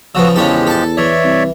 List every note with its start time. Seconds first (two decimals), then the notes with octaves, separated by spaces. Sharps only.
0.15 C#3 F3 B3 F#4 E6
0.36 E2 C#3 F3 G#3 C#4 G4 A4
0.67 A4 A5
0.97 E3 C#5 D5 E5
1.24 C2